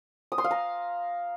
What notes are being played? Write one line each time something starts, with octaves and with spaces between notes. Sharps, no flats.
D#6
C6
F5
A#5